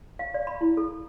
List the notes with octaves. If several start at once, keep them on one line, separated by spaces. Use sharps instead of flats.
F5
D5
B5
E4
A4